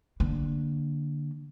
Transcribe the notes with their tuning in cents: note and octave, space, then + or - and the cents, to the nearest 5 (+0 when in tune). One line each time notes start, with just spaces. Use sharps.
D3 +0 A#3 +0